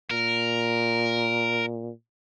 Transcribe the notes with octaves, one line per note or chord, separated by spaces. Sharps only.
A#2 A#4